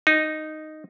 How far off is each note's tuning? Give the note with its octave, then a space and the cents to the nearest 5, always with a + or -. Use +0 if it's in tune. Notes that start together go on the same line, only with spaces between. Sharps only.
D#4 -5